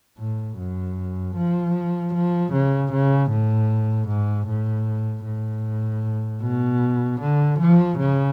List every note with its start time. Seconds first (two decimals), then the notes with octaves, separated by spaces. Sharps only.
0.18 A2
0.58 F#2
1.36 F3
2.14 F3
2.53 C#3
2.92 C#3
3.30 A2
4.08 G#2
4.48 A2
5.25 A2
6.42 B2
7.20 D3
7.59 F3
7.98 C#3